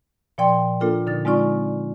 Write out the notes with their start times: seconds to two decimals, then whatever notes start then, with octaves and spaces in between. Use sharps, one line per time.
0.38 A#2 F3 D5 G5 C6
0.80 A#3 D4 F4 A4 A#4
1.07 A#2 D3 D#4 A6
1.25 G#3 C4 D#4 F4 D5 C#6